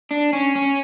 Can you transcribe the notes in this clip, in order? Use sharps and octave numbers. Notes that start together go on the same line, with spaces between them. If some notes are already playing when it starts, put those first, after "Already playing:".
D4
C#4
C#4